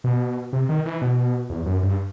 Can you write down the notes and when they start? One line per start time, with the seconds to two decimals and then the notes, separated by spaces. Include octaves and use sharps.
0.04 B2
0.53 C3
0.69 D#3
0.86 E3
1.02 B2
1.50 E2
1.66 F#2
1.83 G2